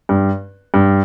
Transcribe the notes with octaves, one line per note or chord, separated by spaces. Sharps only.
G2
G2